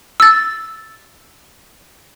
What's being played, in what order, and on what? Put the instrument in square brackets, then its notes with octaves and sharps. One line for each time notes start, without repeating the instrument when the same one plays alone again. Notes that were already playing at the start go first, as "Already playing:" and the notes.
[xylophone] E6 A6